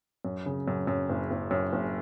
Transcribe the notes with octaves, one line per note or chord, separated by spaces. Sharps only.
F#2
C#3
F#2
F#2
F#1
F#1
F#2
F#1